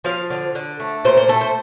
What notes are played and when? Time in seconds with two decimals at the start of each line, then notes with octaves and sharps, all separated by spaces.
0.04 F3 F5
0.30 D3
0.55 D3
0.80 A3
1.05 A#2 C5
1.17 C5
1.29 A3 A4
1.41 C5